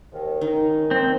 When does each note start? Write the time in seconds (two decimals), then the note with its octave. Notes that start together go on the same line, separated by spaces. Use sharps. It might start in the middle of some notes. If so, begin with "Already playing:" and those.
0.12 D#2 G#2 D#3
0.41 D#3 C#4 D#4
0.91 C4